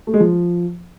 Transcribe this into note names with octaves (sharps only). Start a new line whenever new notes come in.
A3
G#3
F3